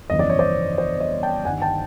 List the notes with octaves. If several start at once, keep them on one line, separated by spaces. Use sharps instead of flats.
G1 F2 C#3 E3 D#5
D5
C#5
C5 D5
C5 D5
C#5 D#5
G5 A5
G1 G2 D#3 F#5 G#5
G5 A5